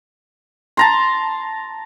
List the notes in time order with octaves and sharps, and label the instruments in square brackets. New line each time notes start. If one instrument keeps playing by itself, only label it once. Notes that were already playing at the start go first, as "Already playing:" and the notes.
[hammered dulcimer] A5 A#5 C6